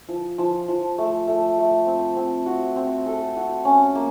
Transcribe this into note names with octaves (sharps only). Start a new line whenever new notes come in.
F3
F3
F3
A3
A3
A3
C4
C4
F#4
C4
A4
F#4
C#4
A#3